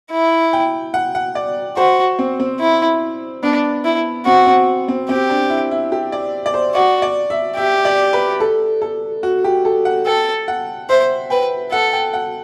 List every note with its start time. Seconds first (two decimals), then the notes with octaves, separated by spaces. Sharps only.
0.12 E4
0.53 G5
0.94 F#5
1.15 F#5
1.35 D5
1.77 F#4 C5
2.19 C4
2.40 C4
2.60 E4
3.43 B3 D4
3.85 E4
4.26 C4 F#4
4.46 C4
4.88 C4
5.09 C4 G4
5.30 D4
5.50 E4
5.71 E4
5.92 G4
6.12 D5
6.46 D5
6.54 C5
6.75 F#4 D5
7.02 D5
7.30 E5
7.57 G4 E5
7.85 D5
8.13 B4
8.40 A4
8.82 A4
9.23 F#4
9.44 G4
9.65 A4
9.85 F#5
10.06 A4 G5
10.48 F#5
10.89 C5 E5
11.30 B4 G5
11.71 A4 F#5
11.93 G5
12.13 F#5